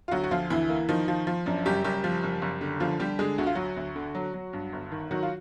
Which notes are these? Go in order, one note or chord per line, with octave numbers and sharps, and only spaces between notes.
F4
D2 F#3 F#4
F#4
D2 F3 F4
D2 E3 E4
A#3
D#3 F3 D#4
F3
F3
F#2 D4
F#1 G3 G4
F#1 G3 G4
F3
F#1
F#1
D3
D3 F3 F4
D3 G3 G4
D3 G#3 G#4
D2 F#4
F4
F#3 F#4
D2
D3
F#3
F#3
G2
G1
D#3
D#3 F#3 F#4
F4